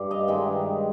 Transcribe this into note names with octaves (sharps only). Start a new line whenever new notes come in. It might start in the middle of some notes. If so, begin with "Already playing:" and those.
Already playing: G2
D#5 F5
G2 D#3 G#3